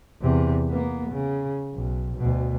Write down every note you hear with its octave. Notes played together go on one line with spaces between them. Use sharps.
E2 C3
A#3 B3
C#3
B1
D2 B2